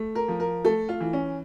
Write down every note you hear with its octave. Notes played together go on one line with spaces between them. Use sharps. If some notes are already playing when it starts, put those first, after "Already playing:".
Already playing: A3
A#4
F3
A#4
A3 A4
F4
E3
C#4